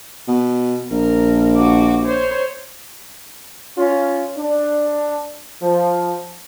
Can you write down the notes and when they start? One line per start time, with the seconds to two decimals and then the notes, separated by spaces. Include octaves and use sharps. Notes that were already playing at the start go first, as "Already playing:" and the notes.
0.28 B2
0.91 A#1 A#4
1.56 F#4 D6
2.05 C5 C#5
3.77 C#4 F4
4.38 D4
5.62 F3